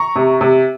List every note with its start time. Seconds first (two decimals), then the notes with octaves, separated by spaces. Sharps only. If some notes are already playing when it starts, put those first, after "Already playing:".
Already playing: A#5 C#6
0.16 C3
0.41 C3